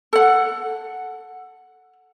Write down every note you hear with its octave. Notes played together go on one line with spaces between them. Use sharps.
A4 F#5